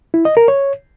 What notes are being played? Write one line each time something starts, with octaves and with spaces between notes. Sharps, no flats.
E4
D#5
A#4
C#5